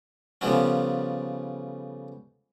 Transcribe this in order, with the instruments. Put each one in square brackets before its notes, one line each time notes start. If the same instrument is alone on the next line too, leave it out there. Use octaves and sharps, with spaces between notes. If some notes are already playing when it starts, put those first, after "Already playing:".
[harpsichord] C#3 F3 G3 A3 B3 C#4